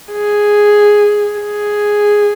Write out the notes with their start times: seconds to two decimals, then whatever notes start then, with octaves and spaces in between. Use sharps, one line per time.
0.12 G#4
1.40 G#4